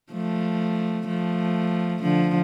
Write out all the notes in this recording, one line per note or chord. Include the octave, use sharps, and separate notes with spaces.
F3 A3
F3 A3
D3 F3